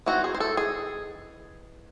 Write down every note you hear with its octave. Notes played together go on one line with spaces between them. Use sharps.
E3 C4 D#4 F#4
G#4
C5
A4
G#4